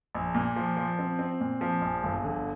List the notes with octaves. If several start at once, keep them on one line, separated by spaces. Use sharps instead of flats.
A#1
A#2
F3
F3
C4
C4
A#2
F3
A#1
G1
D3